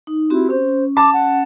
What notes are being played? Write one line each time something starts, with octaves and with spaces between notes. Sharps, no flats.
D#4
C4 E4 F#4 G4
C#4 C5
A5 D6
F#5